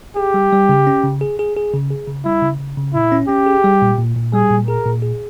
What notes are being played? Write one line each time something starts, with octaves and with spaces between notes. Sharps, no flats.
G4 G#4
G3
G3
C#3
C#4
C#3
G#4
G#4
G#4
C#3
G#4
C#3
G3 E4
C#3
C#3
C#3
A#2 E4
C#4
C#4 G4
G#4
G3
A#2
A#2
A#2
G3 G#4
A#2
G#4 A#4
A#2
G#4